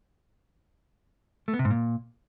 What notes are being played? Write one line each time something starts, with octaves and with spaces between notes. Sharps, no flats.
A3
B3
C3
G#2
A#2